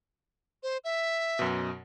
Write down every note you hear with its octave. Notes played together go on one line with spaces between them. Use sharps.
C5
E5
F#2 B2